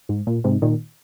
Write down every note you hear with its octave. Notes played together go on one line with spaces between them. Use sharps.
G#2
A#2
G#2 C3
A#2 D#3